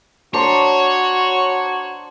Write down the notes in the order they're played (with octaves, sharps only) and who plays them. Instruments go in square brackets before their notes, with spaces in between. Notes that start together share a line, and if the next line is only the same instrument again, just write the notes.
[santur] D4 C5 A#5 [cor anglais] F#4 [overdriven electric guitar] C#5